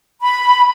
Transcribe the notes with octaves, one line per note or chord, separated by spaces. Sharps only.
B5